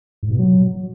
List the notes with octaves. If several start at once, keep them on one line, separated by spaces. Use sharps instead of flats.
G#2
B2
F#3